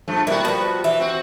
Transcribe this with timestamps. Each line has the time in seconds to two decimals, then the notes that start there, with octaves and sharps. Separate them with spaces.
0.08 G2 F3 A3
0.27 G3 A#3 B3 E4 F#4
0.45 F3 B4
0.84 E3 E5
1.00 C4 F#4